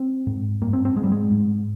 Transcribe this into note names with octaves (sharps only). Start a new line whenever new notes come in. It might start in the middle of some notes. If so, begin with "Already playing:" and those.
Already playing: C4
G#2
G2 A#3
C4
C4
G#2 G#3
G3
G#3
G#2